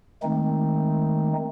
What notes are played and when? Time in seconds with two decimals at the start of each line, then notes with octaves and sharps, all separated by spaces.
0.23 D#3 G#3 A3 C4 D#4